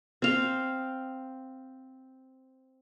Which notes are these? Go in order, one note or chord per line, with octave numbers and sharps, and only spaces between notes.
C4 F5